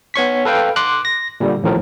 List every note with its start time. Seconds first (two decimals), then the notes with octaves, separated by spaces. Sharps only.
0.14 B3 C#5 C#6 B6
0.45 A4 B4 F5 G5
0.76 C6 D6 F#6
1.05 A#6
1.40 A#2 D3 G3
1.63 A#1 D#2 A2 F3 A#4